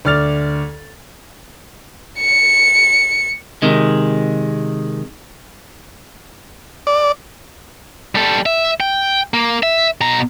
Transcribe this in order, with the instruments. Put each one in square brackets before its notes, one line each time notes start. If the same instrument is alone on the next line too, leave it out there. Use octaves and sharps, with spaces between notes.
[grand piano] D2 D5 F6 A6 F7
[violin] C#7
[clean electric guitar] C3 D#3 G#3
[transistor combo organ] D5
[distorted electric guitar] G3 A4
E5
G5
A#3
E5
B2 A#5